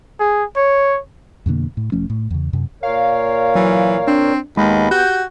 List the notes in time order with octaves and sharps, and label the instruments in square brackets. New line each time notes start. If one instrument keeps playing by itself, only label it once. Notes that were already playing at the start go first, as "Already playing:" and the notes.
[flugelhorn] G#4
C#5
[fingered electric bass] F2 B2 D3 A#3
A2
E1 F3 A3 C#4
A2
E2 C#3
F#2 C3
[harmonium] A#2 A#4 C#5 [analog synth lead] F5
[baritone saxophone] E3 [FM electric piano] F#3
[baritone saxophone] C4 [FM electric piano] D4
[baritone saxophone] D#2 [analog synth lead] G#3 [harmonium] B3 [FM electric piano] B5
[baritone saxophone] F#4 [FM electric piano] G4 [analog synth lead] G6